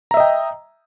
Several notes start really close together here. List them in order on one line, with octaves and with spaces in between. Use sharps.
A#5 E5 D#5 G5